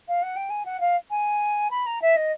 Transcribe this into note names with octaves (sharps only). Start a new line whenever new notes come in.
F5
F#5
G5
G#5
F#5
F5
G#5
B5
A#5
E5
D#5